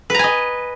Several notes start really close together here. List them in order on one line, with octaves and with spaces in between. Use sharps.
B4 A#5 G#5 D#5